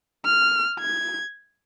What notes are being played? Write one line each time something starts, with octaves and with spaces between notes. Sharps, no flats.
F6
G#6